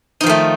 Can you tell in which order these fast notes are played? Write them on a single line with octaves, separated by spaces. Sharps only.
D#4 F3 D#3 A3